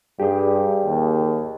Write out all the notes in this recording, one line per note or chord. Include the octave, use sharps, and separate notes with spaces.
G2 G4 G#4 G5
D#2